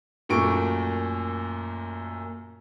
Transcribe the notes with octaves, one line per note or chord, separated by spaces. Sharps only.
F#2 A#2 A3 C#6 D7